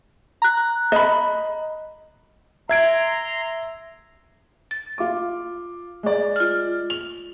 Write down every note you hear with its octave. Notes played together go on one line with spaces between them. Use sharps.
A#5 F#6
D#5 B5
E5 A#5 C6 G#6 D7
A6
F4 D6
G#3 D5
F4 F6
F7